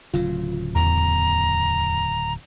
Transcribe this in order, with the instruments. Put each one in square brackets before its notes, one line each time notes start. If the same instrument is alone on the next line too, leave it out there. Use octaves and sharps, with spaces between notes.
[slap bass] D1 C#3 F#3 [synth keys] F4
[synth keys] E2 [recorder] A#5